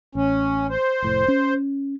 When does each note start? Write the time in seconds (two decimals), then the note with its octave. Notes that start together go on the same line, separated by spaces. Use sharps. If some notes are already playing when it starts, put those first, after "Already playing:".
0.15 A1 C#4
0.70 C5
1.02 F1 A2
1.28 C#4